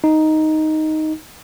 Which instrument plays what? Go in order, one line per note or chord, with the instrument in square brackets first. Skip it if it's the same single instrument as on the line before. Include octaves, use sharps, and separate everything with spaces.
[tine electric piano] D#4